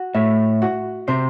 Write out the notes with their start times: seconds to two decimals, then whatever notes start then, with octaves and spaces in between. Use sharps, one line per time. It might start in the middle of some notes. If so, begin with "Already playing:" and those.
Already playing: F#4
0.14 A2 E5
0.62 F#4
1.08 C3 C5